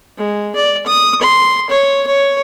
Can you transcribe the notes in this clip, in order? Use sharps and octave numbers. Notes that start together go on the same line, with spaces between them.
G#3
D5
D#6
C6
C#5
C#5